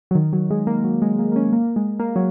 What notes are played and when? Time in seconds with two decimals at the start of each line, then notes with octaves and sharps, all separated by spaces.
0.11 F#3
0.15 D#3
0.33 F#3
0.50 G#3
0.67 A#3
0.84 F#3
1.02 G#3
1.19 A#3
1.32 A#3
1.36 C#4
1.53 A#3
1.76 G#3
1.99 A#3
2.16 F#3